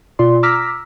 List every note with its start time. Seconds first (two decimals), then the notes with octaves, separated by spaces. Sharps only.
0.19 B2 F4 D5 C6
0.43 A#5 D6 E6 F6 A#6 B6